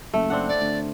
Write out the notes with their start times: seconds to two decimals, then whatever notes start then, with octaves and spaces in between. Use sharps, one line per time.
0.14 F#1 A3
0.30 C4 D4 F#5
0.48 D5
0.60 D2